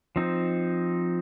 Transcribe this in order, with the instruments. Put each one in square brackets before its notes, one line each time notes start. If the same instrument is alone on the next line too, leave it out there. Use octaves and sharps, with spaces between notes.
[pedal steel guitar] F3 C4 D#4